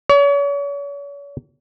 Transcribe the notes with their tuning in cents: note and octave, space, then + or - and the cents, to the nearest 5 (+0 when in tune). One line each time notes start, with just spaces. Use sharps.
C#5 +40